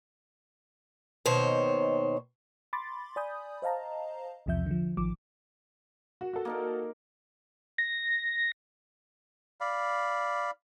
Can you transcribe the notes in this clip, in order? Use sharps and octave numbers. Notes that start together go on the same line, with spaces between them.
D#2 B2 D#3 C5 C#5
B5 C6 D6 A6
D5 G#5 B5 D#6 G6
C5 D#5 F5 A5 A#5
B1 E2 C3 F3 E5 G6
D3 F3
A1 D#3 F3 D6
F#4
F#4 A4
A#3 D#4 A#4
A#6
D5 F5 B5